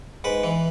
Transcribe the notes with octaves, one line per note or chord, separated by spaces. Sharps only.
G#2 B4
E3